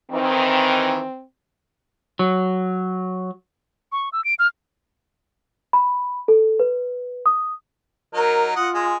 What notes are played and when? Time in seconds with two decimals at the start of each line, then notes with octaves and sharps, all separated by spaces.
0.12 D#3 E3 C4
2.19 F#3
3.92 C#6
4.13 E6
4.25 D7
4.39 F6
5.73 B5
6.28 A4
6.60 B4
7.26 D#6
8.14 F#3 D#4 A#4
8.56 F4 D#5 F#5
8.75 G#3 G#5